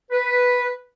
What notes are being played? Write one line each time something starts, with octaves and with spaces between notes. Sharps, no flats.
B4